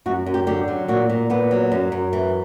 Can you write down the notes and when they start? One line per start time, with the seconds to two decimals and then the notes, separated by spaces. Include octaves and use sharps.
0.06 F#2 F#4
0.26 F#2
0.34 G4
0.47 D3 G4
0.68 F#3
0.88 A#2 F#4
1.09 A#2
1.30 A#2 B3
1.51 F#3
1.72 F#2
1.92 F#2
2.13 E3